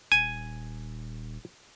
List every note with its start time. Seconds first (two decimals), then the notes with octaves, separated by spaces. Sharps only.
0.12 D#1 G#5